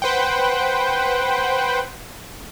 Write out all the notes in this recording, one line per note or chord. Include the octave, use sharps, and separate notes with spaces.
B4 C5 F#5 G5